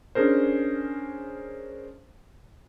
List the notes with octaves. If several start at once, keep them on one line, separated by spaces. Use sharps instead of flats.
C#4 D4 G#4 A#4 C5